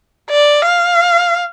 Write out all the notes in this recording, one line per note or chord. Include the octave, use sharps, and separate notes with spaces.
D5
F5